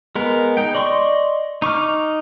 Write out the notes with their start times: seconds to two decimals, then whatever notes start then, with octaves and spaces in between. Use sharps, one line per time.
0.16 G#3 B3 A#4
0.57 D#4 G5
0.75 D5 D#5 C6 C#6
1.62 D#4 C#6 D6 F6